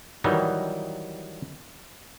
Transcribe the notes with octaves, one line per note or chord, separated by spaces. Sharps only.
D#3 E3 F#3 G3 D#4